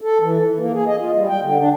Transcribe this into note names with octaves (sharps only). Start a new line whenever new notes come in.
A4
E3
E3
A#3
G#4
D#5
F4
G3
G5
D3
D4